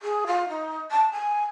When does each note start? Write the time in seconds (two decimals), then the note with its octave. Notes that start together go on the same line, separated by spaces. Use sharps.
0.02 G#4
0.27 F4
0.49 D#4
0.91 A5
1.12 G#5